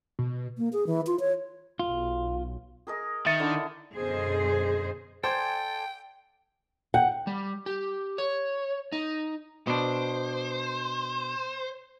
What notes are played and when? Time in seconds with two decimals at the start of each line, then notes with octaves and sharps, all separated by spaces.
0.19 B2
0.58 A#3
0.73 G#4
0.87 E3
1.07 F4
1.20 C#5
1.79 B1 F4
2.87 G#4 A#4 D#5
3.26 D#3 E5 A6 C#7
3.40 D3 E4 D5
3.96 F#2 B2 D3 G#4 C5 D#5
5.24 A4 C5 D5 G5 G#5
6.94 F#5 G5
7.27 G3
7.66 G4
8.18 C#5
8.92 D#4
9.67 B2 D4 C5